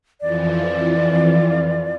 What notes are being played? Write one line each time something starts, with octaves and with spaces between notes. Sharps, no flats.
F2 E3 F3 D5